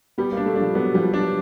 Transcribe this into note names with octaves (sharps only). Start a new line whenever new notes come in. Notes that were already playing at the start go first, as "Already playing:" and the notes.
G3 B3
A#3 D4
A3
F3 D4
F#3 B3
F3 G3
F#3 D4